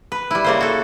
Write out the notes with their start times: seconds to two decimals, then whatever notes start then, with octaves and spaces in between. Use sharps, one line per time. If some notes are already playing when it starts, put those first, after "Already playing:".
0.12 B4
0.31 G3 E4
0.44 C#3 A#3 C5
0.60 F#4 A4